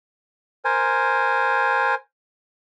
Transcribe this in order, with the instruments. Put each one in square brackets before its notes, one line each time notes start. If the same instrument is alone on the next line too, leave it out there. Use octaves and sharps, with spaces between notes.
[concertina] A#4 C5 G#5